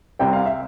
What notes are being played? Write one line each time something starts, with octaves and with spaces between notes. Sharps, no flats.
C2 C3 G3 C4 G5
F5
E5